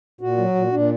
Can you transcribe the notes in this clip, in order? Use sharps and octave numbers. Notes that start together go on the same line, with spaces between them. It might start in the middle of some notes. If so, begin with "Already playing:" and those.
A#2 F#4
F#3
A#2
A#2 D4